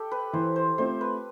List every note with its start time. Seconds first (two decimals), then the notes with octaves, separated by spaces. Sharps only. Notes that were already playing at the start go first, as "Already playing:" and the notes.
Already playing: G4 A4
0.11 B4
0.33 E3 C5
0.56 C5
0.78 A3 C4 F4 C5
1.01 B4